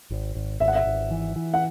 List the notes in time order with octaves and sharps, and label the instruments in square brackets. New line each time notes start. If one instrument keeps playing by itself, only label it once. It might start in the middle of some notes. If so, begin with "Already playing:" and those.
[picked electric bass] G#1
G#1
[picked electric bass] G#1 [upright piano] E5
[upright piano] F#5
E5
[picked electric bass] G#1
E3
E3
[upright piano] F#5